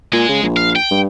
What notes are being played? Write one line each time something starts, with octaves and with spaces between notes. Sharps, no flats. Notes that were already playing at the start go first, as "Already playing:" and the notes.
A#2 G#3 G#5
C#3
A#1
F5
G5
G2